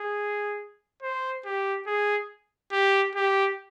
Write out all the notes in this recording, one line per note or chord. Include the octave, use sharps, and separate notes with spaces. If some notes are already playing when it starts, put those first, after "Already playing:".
Already playing: G#4
C5
G4
G#4
G4
G4